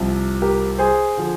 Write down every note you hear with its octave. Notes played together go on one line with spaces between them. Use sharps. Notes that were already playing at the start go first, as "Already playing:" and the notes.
Already playing: C2 C3 F3
G4 A#4
G#4 C5
D3 F3